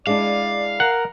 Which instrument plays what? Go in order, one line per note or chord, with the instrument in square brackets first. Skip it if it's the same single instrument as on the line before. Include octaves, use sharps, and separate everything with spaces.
[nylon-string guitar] G#3 D4 E4 [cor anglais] D5 [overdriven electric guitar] F5
[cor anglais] A#4 [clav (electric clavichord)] F#5